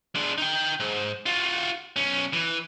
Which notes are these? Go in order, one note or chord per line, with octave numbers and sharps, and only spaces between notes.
G#3 D4
D#4 G5
G#2
F4 F#4
B1 C#4
E3